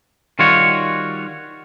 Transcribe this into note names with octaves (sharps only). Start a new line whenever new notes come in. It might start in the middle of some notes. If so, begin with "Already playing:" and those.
D#3 G3 F4 F#4 C#5